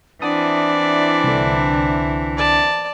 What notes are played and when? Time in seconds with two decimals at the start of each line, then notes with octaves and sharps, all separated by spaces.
0.22 E3 C4 D4 E4 D5 F#5 A5 D#6
1.24 C2 D3
2.37 D5 A5